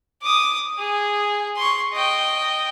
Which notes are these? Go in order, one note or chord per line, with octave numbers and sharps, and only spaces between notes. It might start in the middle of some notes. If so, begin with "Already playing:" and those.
D6 D#6
G#4
C6 C#6
D#5 G5